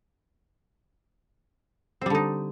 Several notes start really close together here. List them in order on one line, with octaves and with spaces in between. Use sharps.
C4 G3 D3 D#4